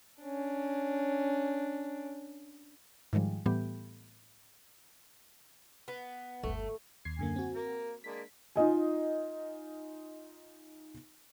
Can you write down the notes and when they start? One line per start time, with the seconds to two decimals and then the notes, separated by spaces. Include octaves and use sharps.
0.23 C#4 D4
3.13 G#2 D#3 F3 G3 G#3
3.46 A2 E3 G3 B3 G4
5.88 B3
6.43 G1 D#2 A3
7.05 D#2 G#6 C7
7.19 F#2 D3 A#3 G#5
7.36 C4 F#4
7.54 A#3 A#4
8.04 G#3 A#3 D4 B6
8.56 D#4 F4 D#5 G#5